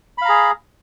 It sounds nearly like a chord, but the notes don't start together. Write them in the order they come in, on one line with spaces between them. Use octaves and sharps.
B5 F5 A#5 G#4